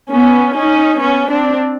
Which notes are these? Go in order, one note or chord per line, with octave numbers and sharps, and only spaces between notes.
B3 C#4
C#4 D#4
B3 C#4
C4 D4